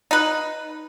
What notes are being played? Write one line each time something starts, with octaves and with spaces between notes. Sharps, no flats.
D#4 B4